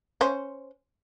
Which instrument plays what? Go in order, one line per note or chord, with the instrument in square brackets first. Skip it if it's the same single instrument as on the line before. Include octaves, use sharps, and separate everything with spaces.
[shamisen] C#4 C5